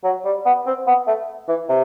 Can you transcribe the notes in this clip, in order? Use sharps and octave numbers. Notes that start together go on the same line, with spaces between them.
F#3
G3
B3
C4
B3
A3
E3
C3